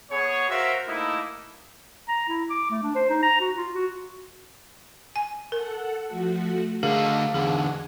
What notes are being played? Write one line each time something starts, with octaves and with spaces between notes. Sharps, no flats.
B3 G#4 C#5
F#4 A#4 C5 E5 F5
A3 A#3 D#4 E4
A#5
E4
D6
A3
D4
C5
D#4
A#5
F#4
F4
F#4
G#5
A4 A#4 F#5
F3 A3 F#4
D3 A3 G#4 A#4 D#5 F5 A5 A#6
E2 D3 G#4 F#5 G#5